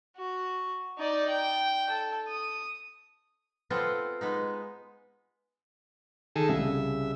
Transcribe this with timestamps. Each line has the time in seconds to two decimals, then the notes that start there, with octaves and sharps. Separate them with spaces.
0.17 F#4
0.99 D#4 D5
1.28 G5
1.90 A4
2.28 D#6
3.70 B3 C4 F4 A4 C5
4.21 G#3 B3 D#4
6.36 D#3 G#4 A4
6.49 C2 C#3 E5